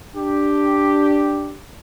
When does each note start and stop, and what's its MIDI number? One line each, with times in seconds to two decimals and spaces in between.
0.16 1.57 62
0.16 1.57 67